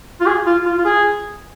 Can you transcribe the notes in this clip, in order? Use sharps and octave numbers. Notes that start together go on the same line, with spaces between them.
F4
G#4
F4
F4
F4
G#4